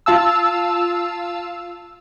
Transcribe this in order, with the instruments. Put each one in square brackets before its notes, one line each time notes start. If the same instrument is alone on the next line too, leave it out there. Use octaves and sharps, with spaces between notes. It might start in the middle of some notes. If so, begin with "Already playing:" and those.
[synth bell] F4 F5 A5 E6